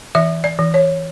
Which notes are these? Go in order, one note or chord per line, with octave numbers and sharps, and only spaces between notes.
E3 E5
D5
E3
C#5